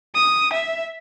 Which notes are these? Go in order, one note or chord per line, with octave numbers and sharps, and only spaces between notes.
D#6
E5